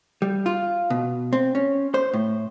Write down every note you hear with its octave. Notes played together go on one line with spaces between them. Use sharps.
G3
F4
B2
C4
C#4
C5
A2